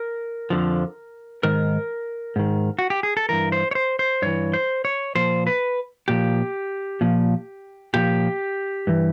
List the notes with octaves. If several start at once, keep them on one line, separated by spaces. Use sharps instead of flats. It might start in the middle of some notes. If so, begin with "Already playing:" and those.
Already playing: A#4
F2 D3 F3
G#2 D#3 A#4
G#2 D#3
F#4
G4
G#4
A4
G2 E3 A#4
C5
C#5
C5
C5
G2 E3 C#5
C5
C#5
A#2 F3 C5
B4
A#2 F3 G4
A#2 F3
A#2 F3 G4
G2 E3